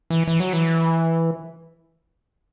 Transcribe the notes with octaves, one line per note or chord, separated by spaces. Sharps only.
E3
E3
F#3
E3